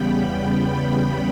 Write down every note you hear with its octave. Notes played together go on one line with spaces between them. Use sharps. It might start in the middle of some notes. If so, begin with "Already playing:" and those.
Already playing: E2 C#3 G3 B3 G5 B5
G5 B5